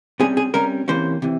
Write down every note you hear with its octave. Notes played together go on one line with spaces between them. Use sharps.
C3 G3 C#4 G#4
G#4
C3 G3 C#4 A#4
C3 E3 A#3 C#4 C5
C3 E3